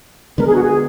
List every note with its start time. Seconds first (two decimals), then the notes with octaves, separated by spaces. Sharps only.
0.38 D3 G#3 B3 A#4
0.47 G#4
0.54 F#4
0.62 G#4